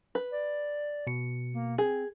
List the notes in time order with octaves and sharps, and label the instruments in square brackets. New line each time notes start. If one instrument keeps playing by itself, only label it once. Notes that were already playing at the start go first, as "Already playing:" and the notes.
[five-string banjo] B4
[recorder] D5
[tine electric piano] B2 C#7
[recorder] A#3
[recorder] C4 [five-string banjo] G#4